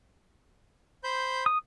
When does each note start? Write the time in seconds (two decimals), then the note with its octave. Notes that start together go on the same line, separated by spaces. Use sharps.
1.04 C5 B5 G6
1.46 D#6